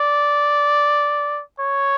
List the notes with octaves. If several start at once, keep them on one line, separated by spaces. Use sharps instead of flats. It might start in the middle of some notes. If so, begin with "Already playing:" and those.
Already playing: D5
C#5